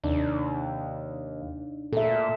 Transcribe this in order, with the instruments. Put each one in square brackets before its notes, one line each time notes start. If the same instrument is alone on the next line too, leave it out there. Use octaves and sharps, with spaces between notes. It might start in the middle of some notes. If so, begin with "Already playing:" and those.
[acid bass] D#2 [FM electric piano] C3 D4 D#4
[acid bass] A#2 [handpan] A4 E5